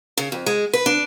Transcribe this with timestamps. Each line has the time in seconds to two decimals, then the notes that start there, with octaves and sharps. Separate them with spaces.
0.18 C#3
0.32 F2
0.46 G#3
0.73 B4
0.86 D4